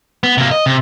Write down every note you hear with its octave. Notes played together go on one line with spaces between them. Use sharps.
B3
C3 A#3
D#5
C3